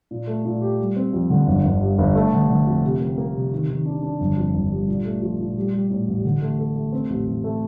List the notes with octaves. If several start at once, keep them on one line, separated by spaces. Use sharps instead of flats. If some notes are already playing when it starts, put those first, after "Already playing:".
A#2
A3
A#2
G4
G3
C4
F2
D3
G1
G1
G2
G1
A3
D3
D3
F2
C3
A#3
A#3
C3
D#3
D#3
D4
D4
G1
F2
G1
G3
A#2
A3
F3
A#2
G3
G3
A2
A1
D3
A3
A4
A3
C4
A1
A1
A3